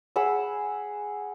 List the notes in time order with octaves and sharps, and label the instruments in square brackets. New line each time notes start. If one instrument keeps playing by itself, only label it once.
[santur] G#4 F#5 B5 E6